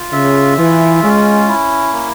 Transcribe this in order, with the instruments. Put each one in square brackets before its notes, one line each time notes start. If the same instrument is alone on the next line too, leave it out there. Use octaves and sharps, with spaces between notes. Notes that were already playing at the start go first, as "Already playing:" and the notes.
Already playing: [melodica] F4
[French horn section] C#3 [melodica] E5
[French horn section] E3 [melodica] F4
[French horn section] G#3 [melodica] C#4
[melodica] E4
A#3